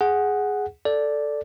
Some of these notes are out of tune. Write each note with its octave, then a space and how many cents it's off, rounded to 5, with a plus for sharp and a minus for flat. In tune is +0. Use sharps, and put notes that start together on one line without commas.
G#4 +0 F#5 +0
A4 +0 D5 +0